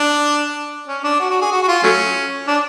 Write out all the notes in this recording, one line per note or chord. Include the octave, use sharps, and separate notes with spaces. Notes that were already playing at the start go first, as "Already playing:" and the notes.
Already playing: D4
C#4
D4
F#4
F#4
G#4
F#4
F#4
F4
F#3 A3 C#4
D4